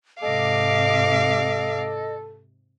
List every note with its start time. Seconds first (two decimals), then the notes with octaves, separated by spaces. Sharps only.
0.22 G#2 C3 A4 D#5 F5 D6